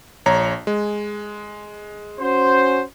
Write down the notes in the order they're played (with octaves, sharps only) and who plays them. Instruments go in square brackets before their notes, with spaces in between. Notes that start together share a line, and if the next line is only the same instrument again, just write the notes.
[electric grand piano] A#1 C#5 A#5
G#3
[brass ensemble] C#4 F#4 C5